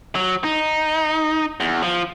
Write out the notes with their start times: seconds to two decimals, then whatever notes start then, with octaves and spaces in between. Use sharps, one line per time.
0.15 F#3
0.44 D#4
1.60 E2
1.83 F3